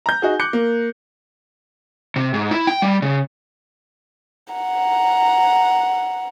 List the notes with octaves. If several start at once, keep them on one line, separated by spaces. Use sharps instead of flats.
A#5 G6
D#4 F#4 G#4
D6 F#6 G6 C#7
A#3
C3
G#2
E4
G5
G3
C#3
F#5 A#5